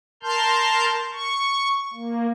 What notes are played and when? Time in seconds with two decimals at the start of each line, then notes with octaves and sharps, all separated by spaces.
0.23 A#4 A5 C6 F6 G6
1.13 C#6
1.93 A#3